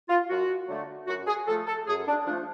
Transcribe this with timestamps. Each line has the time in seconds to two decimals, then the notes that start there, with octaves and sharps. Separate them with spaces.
0.09 F4
0.29 F#2 F#4
0.68 D3 F#3 A3
1.07 F#2 F#4
1.27 G#4
1.47 F3 A3 A4
1.67 A4
1.87 F#2 G#4
2.07 D4
2.26 F3 A3 D4